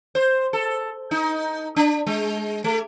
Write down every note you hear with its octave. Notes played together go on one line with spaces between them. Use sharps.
C5
A4
D#4
D4
G#3
A3